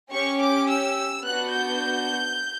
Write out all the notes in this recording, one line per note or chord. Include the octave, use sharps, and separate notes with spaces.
C#4 G4 C#6
D6
E6
B3 D4 F#4 F#6
G6